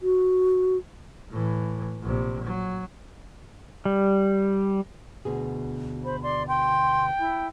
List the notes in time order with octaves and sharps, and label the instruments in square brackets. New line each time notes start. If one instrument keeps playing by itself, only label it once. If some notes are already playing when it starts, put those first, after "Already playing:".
[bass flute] F#4
[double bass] A2 E3
A#1 C3
F#3
[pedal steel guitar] G3
[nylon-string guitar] D2 B2 G#4
[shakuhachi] C5 [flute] B5
[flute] D5 [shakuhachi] C6
[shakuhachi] G5 [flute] C6
[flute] E4